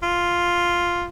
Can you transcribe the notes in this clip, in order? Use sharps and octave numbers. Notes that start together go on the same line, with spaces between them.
F4